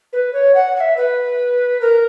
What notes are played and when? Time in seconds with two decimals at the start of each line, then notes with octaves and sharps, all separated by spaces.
0.13 B4
0.33 C#5
0.54 F#5
0.76 F#5
0.80 E5
0.97 B4
1.81 A#4